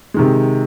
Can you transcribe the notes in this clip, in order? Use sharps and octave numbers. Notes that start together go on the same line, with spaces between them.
C3 D#3 G#3